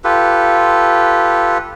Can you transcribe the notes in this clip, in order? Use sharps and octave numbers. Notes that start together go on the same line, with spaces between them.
F4 G4 A4 B4